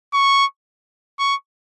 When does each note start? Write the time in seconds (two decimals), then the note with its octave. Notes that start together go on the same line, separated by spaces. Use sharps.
0.14 C#6
1.19 C#6